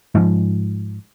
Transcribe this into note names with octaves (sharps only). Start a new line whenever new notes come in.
G#2 F3